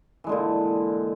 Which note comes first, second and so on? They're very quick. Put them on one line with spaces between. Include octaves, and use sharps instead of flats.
E3 G#3 D3 A#2